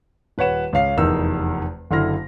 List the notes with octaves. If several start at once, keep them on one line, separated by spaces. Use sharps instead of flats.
D#1 B4 C#5 F#5 E7
C#2 C#4 F5 C7
F1 E2 D#4 A#4 E6
F#1 D3 E4 C6 F6 A#6